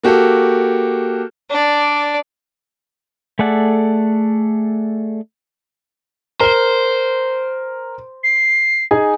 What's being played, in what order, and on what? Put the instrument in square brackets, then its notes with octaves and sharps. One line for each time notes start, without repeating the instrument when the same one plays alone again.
[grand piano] A#3 F#4 G4 A4
[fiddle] D4 D5
[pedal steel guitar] A3 G#4 A4 D5 F#5
[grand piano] A#4 G7 [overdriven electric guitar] C5
[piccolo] C7
[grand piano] D#4 G#4 G#5